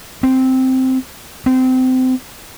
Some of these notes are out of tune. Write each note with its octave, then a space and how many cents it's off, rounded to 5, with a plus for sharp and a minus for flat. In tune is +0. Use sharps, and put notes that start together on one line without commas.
C4 -5
C4 -25